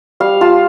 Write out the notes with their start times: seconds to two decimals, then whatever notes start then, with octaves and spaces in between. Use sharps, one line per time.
0.20 G3 F5
0.41 F4 A5